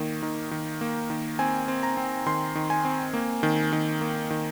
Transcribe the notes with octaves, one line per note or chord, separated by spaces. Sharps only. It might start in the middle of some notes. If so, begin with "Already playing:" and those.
Already playing: D#3 A#3
D#3
D#3
A#3
D#3
C4 G#5
C4
A#5
C4
D#3 C6
D#3
G#5
C4
A#3
D#3
D#3
A#3
D#3